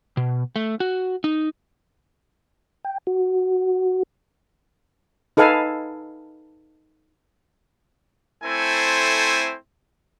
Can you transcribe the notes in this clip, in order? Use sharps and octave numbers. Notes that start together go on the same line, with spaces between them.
B2
A3
F#4
D#4
G5
F#4
D#4 A4 B4 F5 G#5
A3 C4 E4 A4 C5 G#5